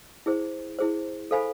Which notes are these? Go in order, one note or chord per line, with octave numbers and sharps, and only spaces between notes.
E4 G#4 C5
E4 G#4 C5
A4 C5 F5 G#5 B5